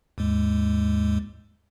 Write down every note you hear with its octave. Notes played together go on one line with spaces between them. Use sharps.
D#2 G#2 G#3